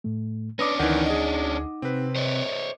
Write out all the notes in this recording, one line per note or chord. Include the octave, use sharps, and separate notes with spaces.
A2 A3
C#4 D4 B4 D6 D#6 A#6
D2 D#3 E3 D#4 F#5
G#4 D#5
C3 C4 B4
C5 C#5 D#5